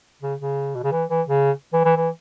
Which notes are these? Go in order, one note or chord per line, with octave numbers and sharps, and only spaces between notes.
C#3
C#3
B2
C#3
E3
E3
C#3
E3
E3
E3